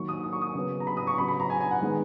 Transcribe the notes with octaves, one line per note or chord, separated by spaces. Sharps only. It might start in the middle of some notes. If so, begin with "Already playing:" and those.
Already playing: D#3 F#3 A#3 C#6
D#6
D#6
C#6
D#6
C#3 F#3 B3
A#5
B5
D#6
C#6
C#3 F#3 B3 B5
B5
A#5
G#5
G#5
F#5
D#3 G#3 B3